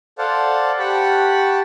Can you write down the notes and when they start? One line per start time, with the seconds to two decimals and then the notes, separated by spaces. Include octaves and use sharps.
0.18 A4 C5 D5 F5 F#5
0.79 G4 F#5 A5 B5 C#6